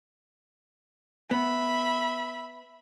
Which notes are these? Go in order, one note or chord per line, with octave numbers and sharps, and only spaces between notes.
B3 E5 B5